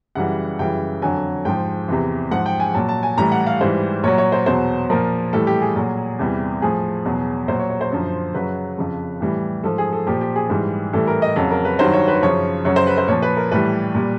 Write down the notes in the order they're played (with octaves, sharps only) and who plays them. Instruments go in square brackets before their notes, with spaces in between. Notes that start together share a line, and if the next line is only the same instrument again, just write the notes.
[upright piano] F#2 C#3 E3 G3 F#5
F#2 C#3 E3 G3 G5
F2 D3 F#3 G#5
G#2 F3 G5
E2 C3 E3
G#2 F3 F#5
G5
G#5
A#2 F#3 A5
A5
G#5
A2 E3 G3 A#5
F#5
F5
G#2 E3 G3 C5
A#2 F#3 C#5
C#5
C5
E2 B2 F#3 C5
A#2 F3 A#4
A2 E3 G3 A4
G4
G#4
A#2 F#3
E2 C3 E3 G3
A2 F3 G#4
E2 B2 F#3
A#2 F#3 C5
C#5
C#5
C5
F#2 D3 F3
F#2 C#3 F#3 B4
F2 C#3 F3
A2 E3 G3
G#2 F3 A4
G#4
A4
A#2 F3 G4
G4
G#4
G#2 E3 G3
A2 E3 G3 A4
A#4
D#5
F2 C#3 F#3
A#4
B4
G2 D#3 F#3 C5
C#5
B4
F#2 C#3 F3 C#5
F#2 C#3 F#3 C#5
C5
B4
C5
A#2 F3 C#5
B4
A#4
A2 E3 G3 B4
A#2 G3